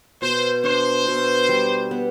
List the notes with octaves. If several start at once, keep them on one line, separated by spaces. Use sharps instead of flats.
B2 C5
D4 C5
B2
G3
B3